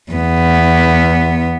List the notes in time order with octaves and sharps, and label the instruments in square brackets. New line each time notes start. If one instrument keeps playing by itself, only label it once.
[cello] E2 B3